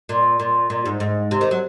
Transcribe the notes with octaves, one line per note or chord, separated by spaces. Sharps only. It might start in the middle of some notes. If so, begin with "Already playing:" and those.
A#2
A#2
A#2
G#2
G#2
C3
D#3
F#3